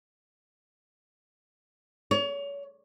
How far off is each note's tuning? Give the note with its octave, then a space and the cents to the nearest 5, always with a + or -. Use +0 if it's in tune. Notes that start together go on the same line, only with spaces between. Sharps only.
C#5 +30